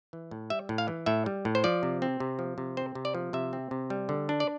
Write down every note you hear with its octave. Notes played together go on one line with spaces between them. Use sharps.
E3
A2
G3 E5
A2
F5
E3
A2 E5
G3
A2
C5
F3 D5
C3
C4
C3
F3
C3
C4 C5
C3
D5
F3
C3 E5
C4
C3
G3
D3
D4
D5